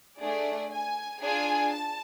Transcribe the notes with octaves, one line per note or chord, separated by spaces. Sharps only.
A3 D4 G#4 D5
G#5
D4 F4 G#4 G#5
A5